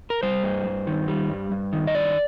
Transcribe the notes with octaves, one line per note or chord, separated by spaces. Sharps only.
A#4
G3 C5
G2
G2
D#3
G3
G2
G2
D#3
D#5
G2 D5